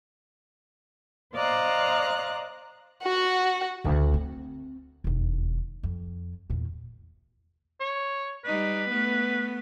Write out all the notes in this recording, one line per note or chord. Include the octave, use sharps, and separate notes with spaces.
C5 D5 D#5 F5 A#5 F#6
F#4 F#5
D2 C#3
C4
E1 D#2
F2
E2 A#2
C#5
G3 D#4 B4
A3 B3